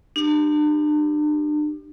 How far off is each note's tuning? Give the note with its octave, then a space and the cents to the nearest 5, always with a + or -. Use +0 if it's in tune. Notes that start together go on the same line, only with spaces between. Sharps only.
D4 +40 G4 +0